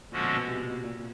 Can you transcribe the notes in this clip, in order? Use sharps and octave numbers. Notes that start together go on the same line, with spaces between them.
A#2 D3 F3 G#3 C#4 F#4
B2
B2
C3
A#2
A#2